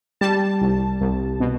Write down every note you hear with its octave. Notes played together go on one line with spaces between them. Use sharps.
G3 A5
C2
C2
B2